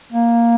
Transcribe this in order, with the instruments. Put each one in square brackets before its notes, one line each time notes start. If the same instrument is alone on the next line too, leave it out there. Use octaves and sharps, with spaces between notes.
[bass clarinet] A#3